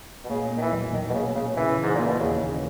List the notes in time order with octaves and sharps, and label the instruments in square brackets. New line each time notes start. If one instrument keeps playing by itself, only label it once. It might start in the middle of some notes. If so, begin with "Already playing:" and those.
[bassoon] B2
[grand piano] A#2 [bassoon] C#3
[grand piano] A#3
[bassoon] D#3
E3
[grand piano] B1
[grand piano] B1 [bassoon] D#3
[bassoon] B2
[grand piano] A#2 [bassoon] C#3
[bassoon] C#3 [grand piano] A#3
[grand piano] C#3 [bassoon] E3
[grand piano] E3
[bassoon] G#2
[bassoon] A#2 [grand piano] A#3
[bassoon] B2
[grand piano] D#2 [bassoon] C#3
[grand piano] C#3